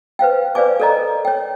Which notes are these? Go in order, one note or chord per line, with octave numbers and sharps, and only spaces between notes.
B4 C5 F5 G5
B4 C5 D5 F5 G#5 D6
A4 A#4 D5 D#5 A#5
C#5 G5